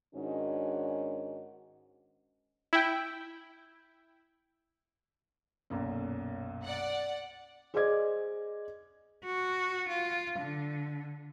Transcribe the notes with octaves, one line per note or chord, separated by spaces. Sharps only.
G#2 D#3 C#4 D4 F#4
E4 G5
B1 F#2 A#2
D5 F#5
G#4 C5 D5 D#5 D6 G#6
F#4
F4
D3